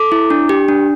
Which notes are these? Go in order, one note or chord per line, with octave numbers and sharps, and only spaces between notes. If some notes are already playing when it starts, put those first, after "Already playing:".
Already playing: A4 D6
E4
D4
G4
D4